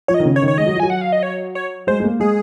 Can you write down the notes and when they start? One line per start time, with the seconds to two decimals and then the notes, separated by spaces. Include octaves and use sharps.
0.08 F3 C#5
0.14 D#5
0.20 D#3
0.25 C#3
0.36 C#5
0.42 D#3
0.48 C#5
0.57 G#3 D#5
0.66 F#3
0.75 F3
0.80 F#3 G#5
0.90 F#5
1.01 F5
1.12 D#5
1.23 C#5
1.55 C#5
1.87 G#3 C5
2.00 G#3
2.04 A#3
2.20 G#3 G#4